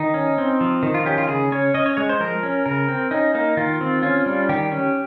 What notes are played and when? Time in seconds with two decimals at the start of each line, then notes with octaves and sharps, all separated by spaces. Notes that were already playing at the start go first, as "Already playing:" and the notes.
Already playing: D#3 D#4
0.14 C#4
0.38 C4
0.61 F3
0.83 D#3
0.94 F4
1.06 C#4 G4
1.18 F4
1.28 C#3 G#4
1.52 C#4 C#5
1.74 C#4 D#5
1.86 C#5
1.97 G#3 C#5
2.09 C5
2.20 F3 A#4
2.43 C#4
2.66 C#3 A#4
2.88 C4
3.11 C#4 D#4
3.34 A#3 D#4
3.57 D#3 F4
3.81 C4
4.03 C#4 F4
4.26 G3
4.49 D#3 G4
4.72 C#4